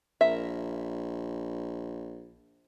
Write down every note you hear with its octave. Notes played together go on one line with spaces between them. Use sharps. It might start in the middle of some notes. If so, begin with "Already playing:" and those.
A#1 A#4 E5